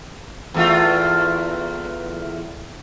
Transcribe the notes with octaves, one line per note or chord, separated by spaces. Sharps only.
E2 A3 F4